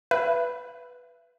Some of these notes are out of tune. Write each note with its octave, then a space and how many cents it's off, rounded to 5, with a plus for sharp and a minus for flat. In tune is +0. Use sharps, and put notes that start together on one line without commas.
B4 +0 E5 +35